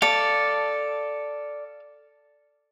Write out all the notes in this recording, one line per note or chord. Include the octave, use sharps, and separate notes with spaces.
A4 D5 F5